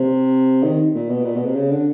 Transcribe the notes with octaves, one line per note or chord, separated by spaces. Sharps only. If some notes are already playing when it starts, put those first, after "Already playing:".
Already playing: C3
D#3
A#2
B2
A#2
B2
C3
C#3
D3